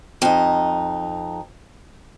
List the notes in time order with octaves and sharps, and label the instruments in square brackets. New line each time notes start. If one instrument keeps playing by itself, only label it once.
[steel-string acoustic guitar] F2 D#4